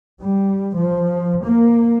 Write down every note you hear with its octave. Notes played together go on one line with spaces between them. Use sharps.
G3
F3
A#3